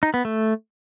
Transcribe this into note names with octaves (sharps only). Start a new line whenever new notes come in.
D#4
B3
A3